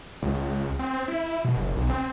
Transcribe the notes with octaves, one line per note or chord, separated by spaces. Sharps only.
C#2
C4
E4
B2
F#1
B1
C4